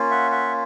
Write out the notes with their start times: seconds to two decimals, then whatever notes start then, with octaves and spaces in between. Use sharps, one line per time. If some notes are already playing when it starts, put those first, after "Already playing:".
Already playing: A#3 C#4 F4
0.11 E5 F#5
0.31 E5 F#5